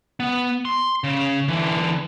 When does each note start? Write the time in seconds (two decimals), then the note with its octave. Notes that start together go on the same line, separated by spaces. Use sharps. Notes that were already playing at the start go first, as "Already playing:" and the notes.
0.20 B3
0.65 C6
1.04 C#3
1.48 D3 E3